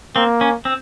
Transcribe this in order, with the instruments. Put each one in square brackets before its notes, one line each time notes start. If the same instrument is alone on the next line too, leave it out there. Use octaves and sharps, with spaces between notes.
[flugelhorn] A#3 [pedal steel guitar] C4
[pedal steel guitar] C#4
C4